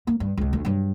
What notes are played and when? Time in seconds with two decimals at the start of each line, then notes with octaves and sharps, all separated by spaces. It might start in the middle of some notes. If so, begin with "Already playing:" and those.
0.07 A#3
0.20 G2
0.37 C#2 C#3
0.53 D2
0.65 G2 F#3